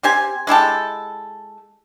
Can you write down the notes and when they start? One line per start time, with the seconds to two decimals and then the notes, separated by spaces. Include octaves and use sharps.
0.03 C4 G4 G#5
0.47 G#3 E4 G4 A4